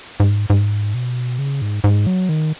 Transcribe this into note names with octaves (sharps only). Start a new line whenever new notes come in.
G#2
G#2
B2
C#3
G#2
G#2
F#3
D#3